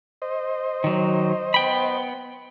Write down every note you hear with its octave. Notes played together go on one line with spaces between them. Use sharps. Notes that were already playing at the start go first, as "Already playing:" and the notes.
C5 D#5
D#3 F#3
B3 G5 B5